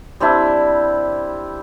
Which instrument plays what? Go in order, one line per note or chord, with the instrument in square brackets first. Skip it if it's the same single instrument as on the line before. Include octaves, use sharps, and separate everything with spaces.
[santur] G3 C4 D4 E4